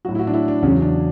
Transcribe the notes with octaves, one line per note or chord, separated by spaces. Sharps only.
A2 F#3 F#4
E4
F#4
D4
E4
D4
E2 C#3 F#3 C#4
D4